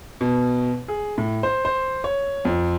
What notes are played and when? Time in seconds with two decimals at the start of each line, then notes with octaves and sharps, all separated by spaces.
0.21 B2
0.88 G#4
1.18 A2
1.43 C5
1.65 C5
2.04 C#5
2.45 F2